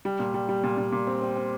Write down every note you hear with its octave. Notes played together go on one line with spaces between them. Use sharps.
G3
A#2
G3
G3
A#2
A#2
A#2
C4
C4
C4